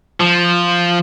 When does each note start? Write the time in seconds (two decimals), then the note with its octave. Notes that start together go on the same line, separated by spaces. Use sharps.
0.21 F3